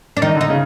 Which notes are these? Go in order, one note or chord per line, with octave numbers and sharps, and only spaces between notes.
D4
D#3 D#4
D3
D#4
C#3